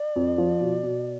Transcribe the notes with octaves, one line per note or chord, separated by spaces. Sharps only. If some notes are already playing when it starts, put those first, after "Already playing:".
Already playing: D5
F2
F3
B2
B2